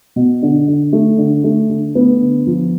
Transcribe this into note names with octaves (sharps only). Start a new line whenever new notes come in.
B2
D3
D3
A3
D3
A3
D3
A3 B3
D3
F3